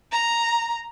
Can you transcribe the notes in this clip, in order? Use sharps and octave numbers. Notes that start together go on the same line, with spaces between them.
A#5